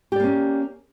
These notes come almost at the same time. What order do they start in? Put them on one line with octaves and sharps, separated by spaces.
G4 D5 A#3 C#4